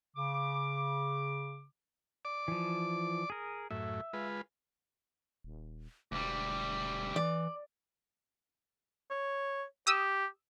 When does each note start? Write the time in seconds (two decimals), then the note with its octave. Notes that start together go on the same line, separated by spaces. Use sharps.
0.17 C#3 D6
2.25 D5 D6
2.48 E3 F3
3.30 G#4 A#4
3.71 F#2 A2 E5
4.13 G#3 F4 B4
5.44 D#1
6.12 E1 D2 G3 D6
7.16 E3 D5
9.11 C#5
9.87 G4 D#6 E6